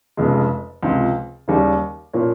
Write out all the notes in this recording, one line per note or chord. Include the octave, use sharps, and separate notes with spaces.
F1 F2 C#3 G#3
C#2 C3 F3
D#2 C#3 G3
A#2 F3 A#3 C#4